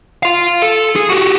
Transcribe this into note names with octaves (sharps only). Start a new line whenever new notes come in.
F5 C6
A4
G#4
F#4 G4